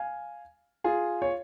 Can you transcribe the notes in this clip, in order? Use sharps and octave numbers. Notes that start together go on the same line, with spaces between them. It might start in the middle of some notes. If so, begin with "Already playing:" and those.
Already playing: F5 G#5
F4 G#4
C#5